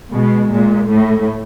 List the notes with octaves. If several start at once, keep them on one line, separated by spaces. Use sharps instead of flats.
B2 G#3
A#2 G#3
A2 A3